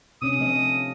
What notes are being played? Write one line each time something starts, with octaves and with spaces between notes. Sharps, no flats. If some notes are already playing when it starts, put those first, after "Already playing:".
C3 C#4 D4 D#6
F3 A3 D#5